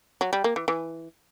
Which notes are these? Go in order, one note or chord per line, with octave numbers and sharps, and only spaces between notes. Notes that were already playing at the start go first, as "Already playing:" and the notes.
F#3
G3
A#3
E3
E3